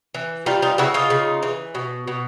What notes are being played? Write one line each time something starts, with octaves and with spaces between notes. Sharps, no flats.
E3
G3 D#4 F4
D#4 F4
C#3 E4 F#4
D#4 F4
C#3
E3
B2
B2